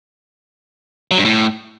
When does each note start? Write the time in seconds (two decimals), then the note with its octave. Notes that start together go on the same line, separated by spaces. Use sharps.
1.11 F#3
1.18 G2
1.25 A2